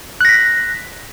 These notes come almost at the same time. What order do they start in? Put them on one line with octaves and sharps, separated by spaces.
F#6 A#6 B6